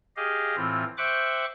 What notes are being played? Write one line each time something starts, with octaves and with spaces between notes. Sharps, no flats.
G4 G#4 D#5 F5
A2 E3 C4 F4
C5 E5 G5 C#6 D6 F#6